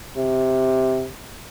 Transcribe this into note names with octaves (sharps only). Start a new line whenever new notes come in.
C3